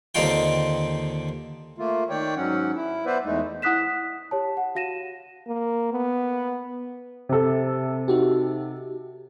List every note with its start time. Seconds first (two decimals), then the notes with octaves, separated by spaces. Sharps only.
0.15 D#2 D3 C4 D#4 F4 G5
1.78 A3 A#3 F4
2.10 D#3 C#5 D5 G5
2.37 G#2 F#3 C#4 F#5
2.75 E4
3.06 B3 B4 C5 D5 E5
3.25 E2 G#3 A3 D#4
3.62 E4 F#5 D#6 F#6 B6 E7
4.31 G4 C#5 A5
4.57 F#5
4.75 F#4 F5 A#6 D#7 E7
5.48 A#3
5.92 B3
7.29 C3 A4
8.08 D#4 F#4 G4